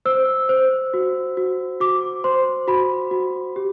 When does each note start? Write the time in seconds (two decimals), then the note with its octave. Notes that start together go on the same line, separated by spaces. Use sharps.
0.05 C5 E6
0.49 C5
0.94 F#4
1.37 F#4
1.80 F#4 D6
2.24 C5 C6
2.67 F#4 B5
3.11 F#4
3.56 G4